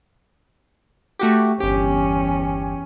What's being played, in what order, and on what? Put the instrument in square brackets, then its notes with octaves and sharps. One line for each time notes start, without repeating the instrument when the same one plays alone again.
[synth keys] A3 F#4 G4
[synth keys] G1 G4 [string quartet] E2 C#4